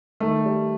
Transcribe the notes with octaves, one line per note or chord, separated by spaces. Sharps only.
D#3 A3
G3